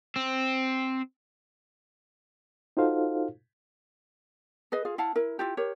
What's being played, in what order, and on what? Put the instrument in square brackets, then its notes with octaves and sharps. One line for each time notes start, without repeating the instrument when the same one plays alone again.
[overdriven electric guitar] C4
[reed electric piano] D#4 F4 F#4 A4 C5 F5
[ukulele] G#4 B4 D#5
F4 G#4 F5
E4 F5 F#5 A5
E4 A#4
E4 F4 G4
G4 A#4 C#5